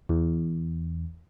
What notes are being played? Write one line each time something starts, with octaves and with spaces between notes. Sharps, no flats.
E2